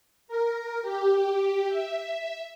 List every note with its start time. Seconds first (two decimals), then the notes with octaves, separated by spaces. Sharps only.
0.28 A#4
0.82 G4
1.69 E5